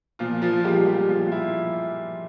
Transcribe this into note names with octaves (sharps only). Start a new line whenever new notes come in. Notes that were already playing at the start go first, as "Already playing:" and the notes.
A#2 F3 F4
F3 F4
F3 G3 G#3 G4
G3 G4
A#2 F3 F4
F4
E4